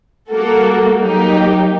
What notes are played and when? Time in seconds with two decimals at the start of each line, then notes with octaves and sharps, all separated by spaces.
0.30 G3 A#3 F#4 A4
0.99 F#3 A#3 D#4 G4